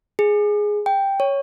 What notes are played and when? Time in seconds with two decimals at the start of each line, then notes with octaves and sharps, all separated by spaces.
0.19 G#4
0.86 G5
1.20 C#5